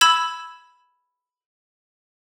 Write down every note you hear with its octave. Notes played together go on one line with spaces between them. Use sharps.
B5 E6 G#6 E7